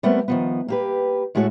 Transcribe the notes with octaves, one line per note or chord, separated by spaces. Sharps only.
G3 A3 B3 C4 A#4
D#3 F3 B3
A#3 G4 B4
A2 G#3 A3 F#4 C5 C#5